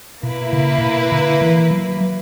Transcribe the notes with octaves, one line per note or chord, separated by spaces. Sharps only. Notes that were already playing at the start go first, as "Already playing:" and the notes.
B2 A#3 E4 B4
C#3
A#2
B2
D3
E3
F#3
F#3